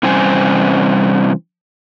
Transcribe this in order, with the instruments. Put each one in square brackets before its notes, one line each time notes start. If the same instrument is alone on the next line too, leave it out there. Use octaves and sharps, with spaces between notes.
[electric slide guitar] C3 E3 G3 C#4 C5 G#5